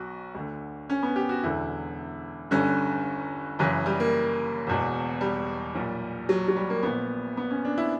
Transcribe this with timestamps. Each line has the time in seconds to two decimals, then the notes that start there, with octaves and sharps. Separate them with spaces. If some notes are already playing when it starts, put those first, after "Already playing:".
Already playing: B1 B2 F#4
0.35 D2 D3
0.90 C#4
1.03 B3
1.16 G4
1.29 F#4
1.43 E1 E2 D3 E4
2.51 G1 G2 D3 C#4
3.59 F#1 F#2 C#3 E3
3.86 G3
4.00 A#3
4.67 E1 E2 B2
5.21 G3
5.75 B1 A#2
6.29 F#3
6.48 F#3
6.56 G3
6.70 A#3
6.83 A#1 A#2 B3
7.37 B3
7.50 C#4
7.65 D4
7.78 E4